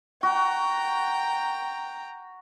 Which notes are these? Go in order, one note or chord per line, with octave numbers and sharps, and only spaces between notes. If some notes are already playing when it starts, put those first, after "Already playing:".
F#4 G5 A#5